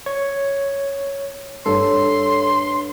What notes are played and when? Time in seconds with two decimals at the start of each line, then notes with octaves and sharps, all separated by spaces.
0.06 C#5
1.66 G2 A4 C#5 C6